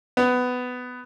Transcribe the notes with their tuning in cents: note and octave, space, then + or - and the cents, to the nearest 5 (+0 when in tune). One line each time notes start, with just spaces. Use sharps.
B3 +15